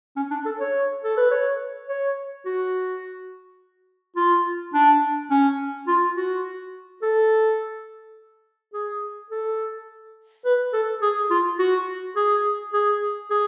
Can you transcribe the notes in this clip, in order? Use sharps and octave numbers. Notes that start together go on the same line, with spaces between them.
C#4
D4
A4
C#5
A4
B4
C#5
C#5
F#4
F4
D4
C#4
F4
F#4
A4
G#4
A4
B4
A4
G#4
F4
F#4
G#4
G#4
G#4